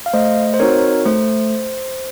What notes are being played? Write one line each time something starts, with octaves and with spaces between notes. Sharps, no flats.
F5
A3 C5 D#5
C5
C4 D#4 F#4 A#4 C#5
A3 C5